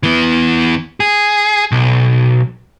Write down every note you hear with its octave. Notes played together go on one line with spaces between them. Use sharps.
E3 B3
G#4
B1